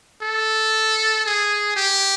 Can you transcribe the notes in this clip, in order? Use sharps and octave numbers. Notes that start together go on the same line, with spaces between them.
A4
G#4
G4